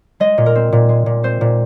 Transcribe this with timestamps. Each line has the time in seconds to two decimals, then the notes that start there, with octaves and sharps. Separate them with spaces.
0.20 G#3 D#5
0.38 A#2
0.46 A#4
0.55 C4
0.72 A#2
0.89 G#3
1.06 A#2
1.23 C4 C5
1.41 A#2